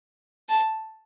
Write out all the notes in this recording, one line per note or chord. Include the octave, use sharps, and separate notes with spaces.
A5